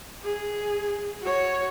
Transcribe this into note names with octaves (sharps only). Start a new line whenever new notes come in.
G#4
F#4 C#5